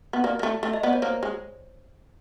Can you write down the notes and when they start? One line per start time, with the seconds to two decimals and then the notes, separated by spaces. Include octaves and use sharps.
0.13 B3
0.24 A#3 D5
0.39 A#3
0.43 A3
0.63 A3 E5
0.74 D#5
0.83 B3 D5
0.93 C#5
1.02 A#3 C5
1.23 G#3